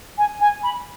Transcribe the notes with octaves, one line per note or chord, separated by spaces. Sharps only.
G#5
G#5
B5